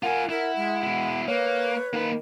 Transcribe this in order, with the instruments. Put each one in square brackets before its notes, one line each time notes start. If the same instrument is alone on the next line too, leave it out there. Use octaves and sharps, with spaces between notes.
[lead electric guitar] F4 G#5 [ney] A#4 [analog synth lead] F#5
[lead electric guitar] E4 [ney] A#4
[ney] G#3
[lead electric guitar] B2 E4
[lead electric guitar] A#3 [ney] B4 [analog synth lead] C#5
[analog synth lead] D#3 [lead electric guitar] A#3 B5